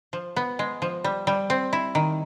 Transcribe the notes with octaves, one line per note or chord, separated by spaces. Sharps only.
F3
B3
G#3
F3
G3
G3
C4
E4
D#3